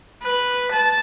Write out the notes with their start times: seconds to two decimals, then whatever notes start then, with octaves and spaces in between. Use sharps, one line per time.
0.23 B4
0.72 A5